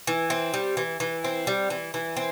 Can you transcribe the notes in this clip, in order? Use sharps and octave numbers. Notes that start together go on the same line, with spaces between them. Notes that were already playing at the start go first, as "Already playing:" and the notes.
E3
C4
G3
E3
E3
C4
G3
E3
E3
C4